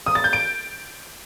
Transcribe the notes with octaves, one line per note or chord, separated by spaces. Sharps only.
D#6
A6
G6
D7